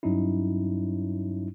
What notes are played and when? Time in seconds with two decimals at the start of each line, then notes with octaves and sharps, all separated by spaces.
0.03 G2 F#3 C#4 D#4 E4